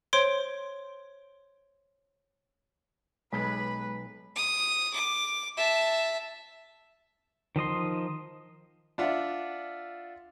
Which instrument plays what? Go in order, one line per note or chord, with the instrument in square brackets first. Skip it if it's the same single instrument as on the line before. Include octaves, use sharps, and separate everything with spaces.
[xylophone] C5 C#5 C6 D7
[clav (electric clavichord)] B1 [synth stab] G#3 [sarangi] B4 [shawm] B5
[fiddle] D#6
D6
E5 A5
[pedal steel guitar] D#3 F3 D#5 C6
[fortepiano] D4 F4 E5 F#5